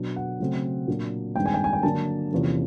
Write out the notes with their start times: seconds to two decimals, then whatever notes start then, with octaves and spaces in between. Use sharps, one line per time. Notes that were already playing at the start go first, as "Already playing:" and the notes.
Already playing: B2 F#3 B3 D4
0.16 F#5
0.40 C#3 F#3 A3 C4
0.87 A#2 F#3 A#3 D4
1.36 G2 D#3 G#3 C4 G5
1.46 G#5
1.54 G5
1.64 G#5
1.73 G5
1.83 D3 F#3 A#3 D4 A5
2.32 E2 C3 F3 A#3 C#4